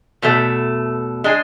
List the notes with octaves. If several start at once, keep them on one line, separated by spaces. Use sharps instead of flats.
E2 B2 A3
G#3 D4 G#4